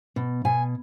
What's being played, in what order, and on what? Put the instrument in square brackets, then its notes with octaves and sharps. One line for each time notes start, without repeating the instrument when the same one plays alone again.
[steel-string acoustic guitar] B2
B2 G#5